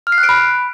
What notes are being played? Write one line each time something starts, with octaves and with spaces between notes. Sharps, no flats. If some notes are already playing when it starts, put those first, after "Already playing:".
F6
C7
F#6
D7
B5